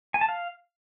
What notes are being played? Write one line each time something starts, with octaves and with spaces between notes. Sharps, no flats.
G#5
A5
F5